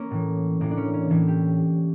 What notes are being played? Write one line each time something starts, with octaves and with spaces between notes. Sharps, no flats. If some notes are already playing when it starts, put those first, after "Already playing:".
Already playing: A#3 C#4
A2 E3
A2 E3 A#3
D4
C#4
C#4
A2 E3 E4
G4